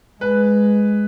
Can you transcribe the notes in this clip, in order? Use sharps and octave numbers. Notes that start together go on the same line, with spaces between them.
G#3 B4